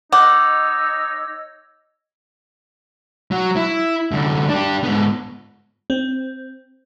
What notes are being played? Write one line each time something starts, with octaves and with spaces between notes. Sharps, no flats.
D#4 C#5 D#5 F#5 D6 E6
F#3
E4
F#2 D3
D4 G4
G#2 B3
C4